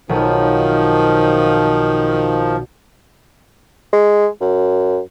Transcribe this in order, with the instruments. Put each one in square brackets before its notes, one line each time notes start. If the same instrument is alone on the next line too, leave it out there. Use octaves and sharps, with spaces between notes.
[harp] B1 [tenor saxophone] D#3 [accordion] F3
[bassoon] G#3
F#2